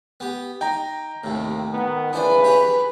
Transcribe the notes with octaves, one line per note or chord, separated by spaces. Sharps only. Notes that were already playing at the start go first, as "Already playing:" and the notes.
B3 G4
D#4 G5 A#5
D#2 A2 C3
D#3 B3
C#3 E3 D4 B4 C5 D5
G4 G#4 C#5